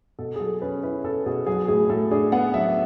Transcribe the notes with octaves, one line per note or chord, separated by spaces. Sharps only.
B2 A4
G#4
F#3 A4
C#4 B4
E4 B4
B2 A4
B2 G#4
F#3 G#4
A2 G#4
A2 A4
D4 G#4
B3 F#5
F#3 E5